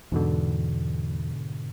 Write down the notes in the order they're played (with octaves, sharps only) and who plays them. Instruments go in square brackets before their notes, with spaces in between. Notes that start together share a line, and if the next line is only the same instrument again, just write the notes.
[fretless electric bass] E2 [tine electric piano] G#2 B2 D3